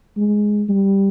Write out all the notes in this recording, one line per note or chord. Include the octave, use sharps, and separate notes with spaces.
G#3
G3